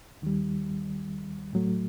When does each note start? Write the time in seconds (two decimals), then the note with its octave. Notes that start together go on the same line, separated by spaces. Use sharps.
0.22 D#2 D#3 G3
1.53 A2 F#3 A3